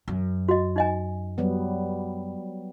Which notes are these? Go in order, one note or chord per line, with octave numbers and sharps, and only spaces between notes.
F#2
F#4 D#5
D#4 D#5 G#5
F#3 G3 B3